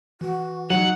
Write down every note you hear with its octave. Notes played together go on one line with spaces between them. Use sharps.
E3 F#4
F#3 D#4 F#5